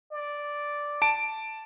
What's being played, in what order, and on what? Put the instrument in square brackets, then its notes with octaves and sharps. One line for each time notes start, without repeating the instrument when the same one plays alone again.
[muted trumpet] D5
[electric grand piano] A5 D7